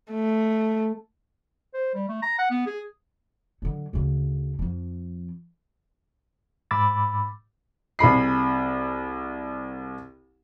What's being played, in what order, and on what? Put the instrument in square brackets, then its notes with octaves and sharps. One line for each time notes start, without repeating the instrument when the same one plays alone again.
[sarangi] A3
[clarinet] C5
G3
A3
A#5
F#5
B3
G#4
[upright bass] D3 F#3
D2 C#3
F2 F3
[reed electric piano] G#2 B5 D6 E6 A6
[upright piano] C2 G#4 B5 C7